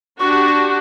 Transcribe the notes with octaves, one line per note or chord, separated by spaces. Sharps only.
D4 F#4 G4 C#6